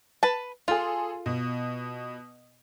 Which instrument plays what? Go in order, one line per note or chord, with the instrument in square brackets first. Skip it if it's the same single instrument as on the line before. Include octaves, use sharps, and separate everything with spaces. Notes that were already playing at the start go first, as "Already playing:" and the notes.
[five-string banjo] B4 A5
[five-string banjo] F4 [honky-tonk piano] G#4 A4 C6
[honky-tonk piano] B2